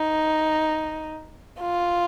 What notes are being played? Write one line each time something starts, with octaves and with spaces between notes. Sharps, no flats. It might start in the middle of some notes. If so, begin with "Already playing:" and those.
Already playing: D#4
F4